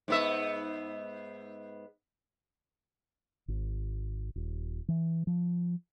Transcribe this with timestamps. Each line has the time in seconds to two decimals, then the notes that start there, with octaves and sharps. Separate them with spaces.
0.08 G#2 B3 E5
3.48 G#1
4.36 D#1
4.88 E3
5.27 F3